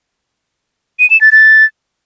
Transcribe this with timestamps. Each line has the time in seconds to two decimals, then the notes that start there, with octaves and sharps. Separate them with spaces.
0.99 D#7
1.10 E7
1.21 A6
1.32 A6